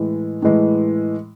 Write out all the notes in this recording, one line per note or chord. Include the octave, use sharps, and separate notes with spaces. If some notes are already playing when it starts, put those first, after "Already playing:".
Already playing: A2 E3 G#3
A2 E3 G#3